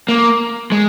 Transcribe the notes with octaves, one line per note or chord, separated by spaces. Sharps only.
A#3
G#3